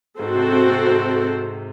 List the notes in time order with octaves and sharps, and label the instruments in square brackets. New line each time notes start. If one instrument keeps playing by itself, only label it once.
[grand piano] G#2 [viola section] C4 F#4 A4 C5
[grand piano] C3
C3
C3
G#2